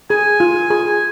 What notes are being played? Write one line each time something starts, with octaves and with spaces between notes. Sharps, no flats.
G#4 G#5
F4
G#4